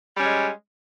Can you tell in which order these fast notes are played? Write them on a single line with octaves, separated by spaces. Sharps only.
G3 C#4 G#3